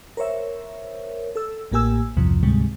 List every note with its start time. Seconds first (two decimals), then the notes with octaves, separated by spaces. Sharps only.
0.17 A#4 C5 C#5 E5
1.36 A4 E6
1.72 A1 A2 A#3 G4 G#5 E6
2.17 B1 E2 G2 C3 F3
2.43 D2 G#2 C3 G3 G#3